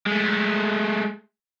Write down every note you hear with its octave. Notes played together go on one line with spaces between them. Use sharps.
G#3 A3